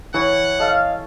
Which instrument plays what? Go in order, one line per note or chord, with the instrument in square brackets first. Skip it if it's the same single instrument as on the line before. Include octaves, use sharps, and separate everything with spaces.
[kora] E3 E4 [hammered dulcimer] C#5 [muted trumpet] F#5
[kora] A4 [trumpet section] D#5 F5